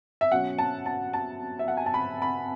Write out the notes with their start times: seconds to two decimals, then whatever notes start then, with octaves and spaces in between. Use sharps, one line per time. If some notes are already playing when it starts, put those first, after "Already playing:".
0.21 E5
0.32 B2 F#3 C#4 F#5
0.58 A5
0.86 A5
1.13 A5
1.59 E5
1.68 F#5
1.77 G#5
1.86 A5
1.94 B5
2.22 B5